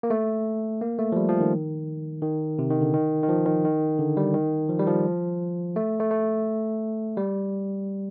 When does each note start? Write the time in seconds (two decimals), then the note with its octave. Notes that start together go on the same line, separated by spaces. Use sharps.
0.03 A#3
0.10 A3
0.81 A#3
0.99 A3
1.12 F3
1.16 G3
1.29 F3
1.40 D#3
2.22 D#3
2.59 C3
2.70 D#3
2.81 D3
2.94 D#3
3.23 D#3
3.29 F3
3.46 D#3
3.65 D#3
3.99 D3
4.17 G3
4.35 D#3
4.69 F3
4.79 G3
4.87 F3
5.76 A3
6.00 A3
6.11 A3
7.17 G3